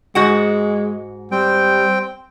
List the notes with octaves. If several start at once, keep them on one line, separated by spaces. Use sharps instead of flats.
G#2 G#3 F#4 F#5
G3 C4 G5